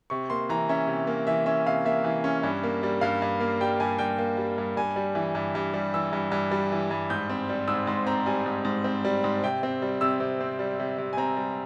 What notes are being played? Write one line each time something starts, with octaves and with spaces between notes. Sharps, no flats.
C3 C#6
A#3 C6
E3 A#5
C#4 E5
C3
A#3
E3 E5
C#4 E5
C3 F5
A#3 E5
E3
C#4
G2
A#3
G3
G2 F5
G2
A#3
G3 G5
G2 G#5
G2 G5
A#3
G3
G2
G2 G#5
G3
E3
G2
G2
G3
E3 E6
G2
G2
G3
E3
G2
G#2 G6
C4
G3
G#2 E6
G#2 C6
C4 A#5
G3 G#5
G#2
G#2
C4
G3
G#2
C3 G5
C4
G3
C3 E6
C3
C4
G3
C3
C3
G#5
C4 A#5
G3